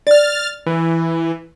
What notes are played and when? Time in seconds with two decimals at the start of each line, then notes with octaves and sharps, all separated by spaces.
0.07 D5 F6 A6
0.66 E3